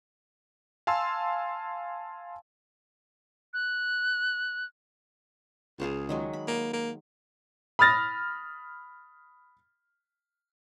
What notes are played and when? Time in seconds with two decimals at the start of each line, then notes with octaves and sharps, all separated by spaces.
0.87 F5 G#5 A5 C6 E6
3.54 F#6
5.80 C#2 G#4 F5 A5
6.09 D#3 F#3 G#3
6.33 B5
6.48 A#3
6.73 A#3
7.79 B5 D#6 F6 A6 A#6